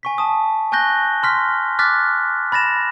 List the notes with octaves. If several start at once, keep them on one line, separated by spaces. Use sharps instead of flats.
G#5 C#6 B6
A5 D#6
G#5 C#6 F#6 G6 A#6 G7
C6 F6 B6
D6 F6 F#6 A6 B6
B5 A6 A#6 E7